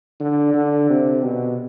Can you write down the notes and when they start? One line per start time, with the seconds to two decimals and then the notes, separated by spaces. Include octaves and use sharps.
0.20 D3
0.54 D3
0.89 C3
1.24 B2